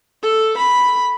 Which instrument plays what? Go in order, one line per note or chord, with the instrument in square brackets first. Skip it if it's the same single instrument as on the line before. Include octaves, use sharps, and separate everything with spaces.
[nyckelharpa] A4
B5